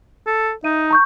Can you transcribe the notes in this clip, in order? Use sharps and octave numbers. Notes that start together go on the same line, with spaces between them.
A4
D#4 E5 D#7
A#5 C#6 G6